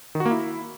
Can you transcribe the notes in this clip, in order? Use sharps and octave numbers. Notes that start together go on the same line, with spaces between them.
D#3
F#4
A#3
E4